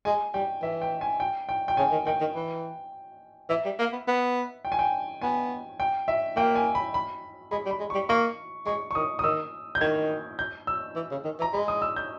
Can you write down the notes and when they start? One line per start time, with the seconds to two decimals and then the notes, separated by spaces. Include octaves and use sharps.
0.05 G#3 G#5
0.34 G3 G5
0.62 E3 E5
0.82 G5
1.01 G#5
1.20 G5
1.49 G5
1.68 G5
1.77 C#3 G#5
1.91 D#3
2.06 D#3 G5
2.20 D#3
2.35 E3
3.49 E3 E5
3.65 G3
3.79 A#3
3.92 B3
4.08 B3
4.65 G5
4.72 G#5
4.79 G5
5.21 B3 G#5
5.80 G5
6.08 E5
6.36 A#3 G5
6.55 G#5
6.75 B5
6.94 B5
7.51 G#3 B5
7.66 G3
7.71 B5
7.80 G#3
7.90 C#6
7.94 G3
8.09 A#3 C#6
8.66 G#3 C#6
8.91 C#6
8.95 D#3 D#6
9.19 D#6
9.23 D#3 E6
9.75 G6
9.81 D#3 G#6
10.39 G6
10.67 E6
10.96 E3
11.11 C#3
11.24 D#3
11.39 E3
11.42 A#5
11.53 G#3 B5
11.68 D#6
11.82 E6
11.96 G6